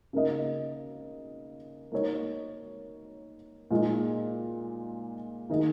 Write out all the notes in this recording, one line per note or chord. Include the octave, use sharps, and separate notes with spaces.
C#3 A#3 D#4 A#4 D#5
A#3 D#4 A#4 C#5
A#2 G#3 D#4
D#3 A#3 D#4 G#4 D#5